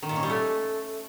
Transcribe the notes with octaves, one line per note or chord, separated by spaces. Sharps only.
D#3
A#2
C#4
G3
A3